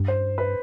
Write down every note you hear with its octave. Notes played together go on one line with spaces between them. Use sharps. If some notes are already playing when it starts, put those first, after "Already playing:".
Already playing: G2
C5
B4